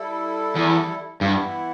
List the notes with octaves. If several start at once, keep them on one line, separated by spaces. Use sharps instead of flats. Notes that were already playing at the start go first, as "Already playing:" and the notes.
Already playing: G3 E4 A4
E2
G2 E3 B3 E4